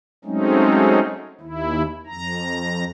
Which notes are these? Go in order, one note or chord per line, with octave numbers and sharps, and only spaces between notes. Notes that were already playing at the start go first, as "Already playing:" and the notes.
F#3 G#3 A3 C4 C#4 D#4
D#2 E4
F2 A#5